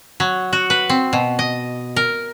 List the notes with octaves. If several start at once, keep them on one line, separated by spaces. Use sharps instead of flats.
F#3
F#4
B4
C4
B2
D#5
A#4